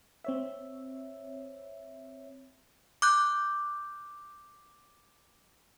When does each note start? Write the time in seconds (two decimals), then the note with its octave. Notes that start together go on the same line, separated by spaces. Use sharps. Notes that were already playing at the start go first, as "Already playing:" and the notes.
0.24 C4 C#5 E5
3.02 D6 F#6 G6